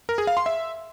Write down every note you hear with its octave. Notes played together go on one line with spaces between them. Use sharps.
A#4
G#4
F5
C6
E5